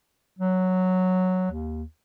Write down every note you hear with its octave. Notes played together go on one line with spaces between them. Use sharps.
F#3
D#2